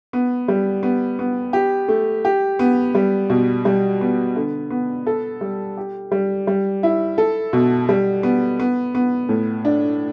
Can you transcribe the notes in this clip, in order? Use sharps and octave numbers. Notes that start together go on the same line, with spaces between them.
B3
G3
B3
B3
G4
A3
G4
B3
G3
B2
G3
B3
D3
B3
A4
G3
G4
G3
G3
E4
A4
B2
G3
B3
B3
B3
A2
D4